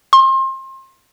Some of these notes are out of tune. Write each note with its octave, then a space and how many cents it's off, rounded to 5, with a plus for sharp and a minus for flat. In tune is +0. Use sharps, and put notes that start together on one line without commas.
C6 +30